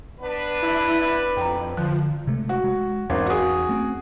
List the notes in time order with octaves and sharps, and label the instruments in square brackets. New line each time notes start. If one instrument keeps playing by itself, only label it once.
[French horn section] B3 D4 B4
[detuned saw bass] E4
[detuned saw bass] F2 [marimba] G5 A#5
[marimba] D3 [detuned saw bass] F3
[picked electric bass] C3 G#3 A3
[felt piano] F#4
[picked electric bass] G#3
[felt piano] G#1 [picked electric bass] E2 C#4
[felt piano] F#4 G#4
[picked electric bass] A3 C4 C#4